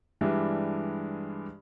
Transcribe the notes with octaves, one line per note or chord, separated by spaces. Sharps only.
G2 E3 G3 G#3 D4 E4